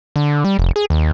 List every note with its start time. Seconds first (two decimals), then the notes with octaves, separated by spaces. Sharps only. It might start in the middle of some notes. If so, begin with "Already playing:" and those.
0.16 D3
0.44 G3
0.59 F1
0.76 G#4
0.90 D#2